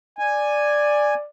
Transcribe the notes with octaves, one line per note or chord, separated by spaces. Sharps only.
D5 G#5